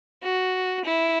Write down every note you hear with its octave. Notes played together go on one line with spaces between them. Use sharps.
F#4
E4